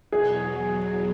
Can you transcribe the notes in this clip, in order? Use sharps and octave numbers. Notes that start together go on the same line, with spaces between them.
E2 B2 F#3 G#4